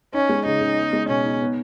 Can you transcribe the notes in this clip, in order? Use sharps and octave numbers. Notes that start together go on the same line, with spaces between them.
C#4 D#4
G#3
C#3 D#4
C#3
B3
G#3
B2 C#4
D#4
B3